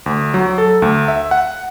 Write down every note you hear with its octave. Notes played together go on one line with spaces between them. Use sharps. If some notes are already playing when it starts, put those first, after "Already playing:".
D2
F#3
A4
D2
E5
F#5